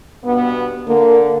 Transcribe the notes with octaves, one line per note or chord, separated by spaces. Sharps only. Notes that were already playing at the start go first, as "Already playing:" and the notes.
G2 B2 B3
D3 A#3